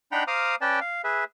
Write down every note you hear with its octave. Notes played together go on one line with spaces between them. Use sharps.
D4 D#4 F#5 G5 A#5 B5
C5 F5 A#5 D6 D#6 F6
C#4 B4 D5 G5 A5
F5
G#4 B4 E5